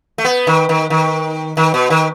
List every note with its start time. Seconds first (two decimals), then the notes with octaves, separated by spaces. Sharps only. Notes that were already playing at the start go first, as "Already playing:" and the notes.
0.18 A3
0.25 B3
0.47 D#3
0.69 D#3
0.90 D#3
1.57 D#3
1.74 B2
1.90 D#3